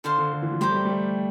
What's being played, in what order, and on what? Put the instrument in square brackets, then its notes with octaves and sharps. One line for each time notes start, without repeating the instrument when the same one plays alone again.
[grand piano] D3 [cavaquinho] A4 C5 F5 C6
[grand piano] D3
D3
E3
F3
[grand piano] G3 [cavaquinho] G4 C5 G5 A#5
[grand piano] A3
G3
G3
A3